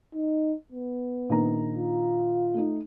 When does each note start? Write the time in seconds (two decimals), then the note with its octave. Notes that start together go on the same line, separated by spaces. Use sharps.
0.14 D#4
0.72 B3
1.29 A#1 D#3 A#5
1.76 F4
2.54 A3 D#4